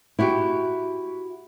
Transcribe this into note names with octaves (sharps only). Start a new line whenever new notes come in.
E4 F#4 G4